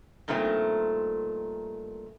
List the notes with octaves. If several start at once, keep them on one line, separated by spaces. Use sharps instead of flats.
G2 A#2 D#3 A3 C4